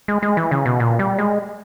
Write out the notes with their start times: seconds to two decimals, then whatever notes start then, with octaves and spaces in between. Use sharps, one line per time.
0.08 G#3
0.23 G#3
0.37 E3
0.51 C#3
0.66 B2
0.80 A#2
0.99 G3
1.19 G#3